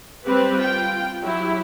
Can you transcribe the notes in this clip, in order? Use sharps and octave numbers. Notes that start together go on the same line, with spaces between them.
G3 C4 G4 B4
F4 G5
F#3 E4 G4